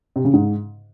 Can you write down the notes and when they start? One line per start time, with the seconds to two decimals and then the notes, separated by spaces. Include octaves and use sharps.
0.16 C3
0.25 C#3
0.34 G#2